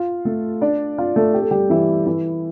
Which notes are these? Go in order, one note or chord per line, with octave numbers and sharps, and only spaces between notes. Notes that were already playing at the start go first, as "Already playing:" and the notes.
Already playing: F4 F5
A3 A4
D4 D5
F4 F5
A3 A4
G4
A4
G3 G4
E3 E4
E3 E4